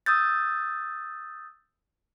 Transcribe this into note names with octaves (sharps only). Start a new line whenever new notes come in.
D#6 E6 G6 A6